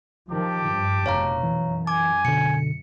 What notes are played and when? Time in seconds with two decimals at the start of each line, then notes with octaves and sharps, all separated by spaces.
0.31 D#3 F3 G4 A5 D6
0.67 G2
1.06 F1 B2 C#5 F5 A#5
1.43 F#2 E3
1.87 G#5 D6
2.25 B2 D3 C#7